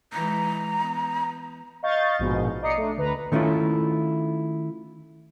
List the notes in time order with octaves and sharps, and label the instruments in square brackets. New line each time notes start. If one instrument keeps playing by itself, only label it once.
[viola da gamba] E3 G#3 [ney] A#5
[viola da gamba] B3
[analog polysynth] D#5 F5 C#6 G6 A6
A#1 G#2 B2
D5 D#5 A#5 D#6 C7 C#7
A3 D4
D2 B4 A#5
[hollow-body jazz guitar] D#3 A3 C#4 E4 F4